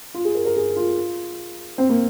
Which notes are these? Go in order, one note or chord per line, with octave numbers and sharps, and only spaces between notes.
F4
G#4
A#4
A#4
G#4
F4
C4
A#3